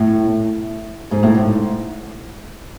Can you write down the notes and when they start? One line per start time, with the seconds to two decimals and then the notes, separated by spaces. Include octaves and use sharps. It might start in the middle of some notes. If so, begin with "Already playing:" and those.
Already playing: A2
1.11 G#2
1.23 A2
1.34 G#2